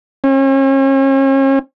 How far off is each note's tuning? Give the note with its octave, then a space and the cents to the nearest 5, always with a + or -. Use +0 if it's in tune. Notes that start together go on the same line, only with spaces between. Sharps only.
C#4 -40